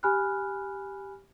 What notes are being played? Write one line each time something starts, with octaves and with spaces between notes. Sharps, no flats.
G4 G#5 B5 F6 F#6